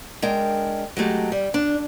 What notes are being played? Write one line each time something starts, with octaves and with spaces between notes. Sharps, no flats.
G#3 D4 A#4 G5
F#3 G#3 A3 G4
G3
D4